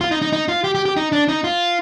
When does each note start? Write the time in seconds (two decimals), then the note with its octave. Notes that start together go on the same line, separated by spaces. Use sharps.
0.01 F4
0.11 D#4
0.22 D#4
0.33 D#4
0.48 F4
0.64 G4
0.75 G4
0.85 G4
0.97 D#4
1.12 D4
1.28 D#4
1.44 F4